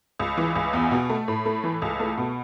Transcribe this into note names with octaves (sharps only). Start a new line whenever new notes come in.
C#2
E3
C#2
E2
B2
A3
A2
A3
E3
C#2
A3
B2